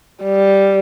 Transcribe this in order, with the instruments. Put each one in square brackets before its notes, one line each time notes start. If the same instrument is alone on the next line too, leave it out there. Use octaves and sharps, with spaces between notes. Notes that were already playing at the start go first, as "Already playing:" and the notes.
[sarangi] G3